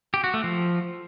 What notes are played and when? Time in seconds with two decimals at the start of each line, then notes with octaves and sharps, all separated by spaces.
0.14 G4
0.24 F#4
0.34 A3
0.44 F3